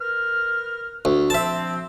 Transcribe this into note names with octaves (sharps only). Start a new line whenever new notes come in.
A#4 B4 F6
D2
F3 C4 E5 A5